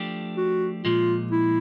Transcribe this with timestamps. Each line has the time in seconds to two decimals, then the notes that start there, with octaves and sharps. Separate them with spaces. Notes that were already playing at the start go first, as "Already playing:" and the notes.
Already playing: F3 A3 D4 G4
0.37 F#4
0.84 A#2 F3 G#3 F4
1.31 E4